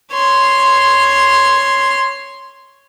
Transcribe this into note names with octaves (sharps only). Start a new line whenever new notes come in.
C#5 C6